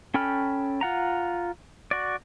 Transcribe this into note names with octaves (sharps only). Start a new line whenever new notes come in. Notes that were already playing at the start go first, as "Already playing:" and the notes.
C#4 A4 G5 B5 F6
F4 F#5 A#5
F#4 D5